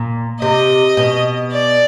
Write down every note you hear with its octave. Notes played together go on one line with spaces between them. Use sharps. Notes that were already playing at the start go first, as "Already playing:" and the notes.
Already playing: A#2
C3 D#5
B2
D5